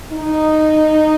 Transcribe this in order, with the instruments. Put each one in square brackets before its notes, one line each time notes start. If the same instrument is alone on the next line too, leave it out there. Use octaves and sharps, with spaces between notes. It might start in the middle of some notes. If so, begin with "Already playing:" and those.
[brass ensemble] D#4